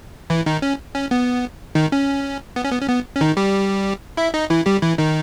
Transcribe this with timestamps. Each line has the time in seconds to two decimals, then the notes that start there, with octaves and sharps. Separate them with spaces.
0.30 E3 E4
0.46 D#3 D#4
0.62 C#4
0.95 C#4
1.11 B3
1.75 D#3 D#4
1.92 C#4
2.56 B3
2.64 C#4
2.72 B3
2.81 C#4
2.88 B3
3.16 C#4
3.21 D#3 D#4
3.37 G3 G4
4.17 E4 E5
4.34 D#4 D#5
4.50 E3 E4
4.66 G3 G4
4.82 E3 E4
4.98 D#3 D#4